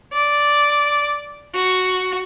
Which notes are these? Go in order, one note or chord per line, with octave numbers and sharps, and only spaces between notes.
D5
F#4